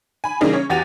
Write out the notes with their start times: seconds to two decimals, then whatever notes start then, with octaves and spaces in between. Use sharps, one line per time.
0.24 G#5 B5
0.41 C#3 E3 G3 A#3 D#4 G#4
0.53 C#4 C#5
0.70 E2 F#4 G4 A6 D#7 F7